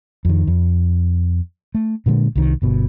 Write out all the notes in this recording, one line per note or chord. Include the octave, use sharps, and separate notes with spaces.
F2 D#3
F2
A3
A#2 D3 F#3 G#3
C2 D#3
G1 B2